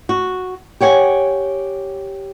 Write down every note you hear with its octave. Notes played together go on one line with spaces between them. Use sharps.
F#4
G4 C#5 F#5 G#5